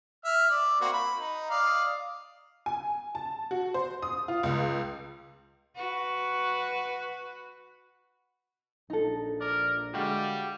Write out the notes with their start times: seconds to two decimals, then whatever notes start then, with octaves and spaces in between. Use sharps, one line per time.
0.25 E5 F6
0.50 D5
0.81 A#3 C4 F#4
0.93 B5
1.17 D#4
1.50 D5 D#5 F5
2.66 G#5
3.15 A5
3.51 F#4
3.74 C5
4.02 D#6
4.28 F4
4.43 C#2
5.76 F#4 B4
8.90 A#1 D#4 A4
9.41 A#4 D5
9.94 D3 G3 G#3 F#4 G4 F5